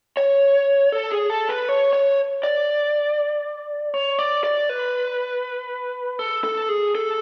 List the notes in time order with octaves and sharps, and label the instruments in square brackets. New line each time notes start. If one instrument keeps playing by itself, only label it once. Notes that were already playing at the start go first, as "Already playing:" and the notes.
[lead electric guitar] C#5
A4
G#4
A4
B4
C#5
C#5
D5
C#5
D5
D5
B4
A4
A4
G#4
A4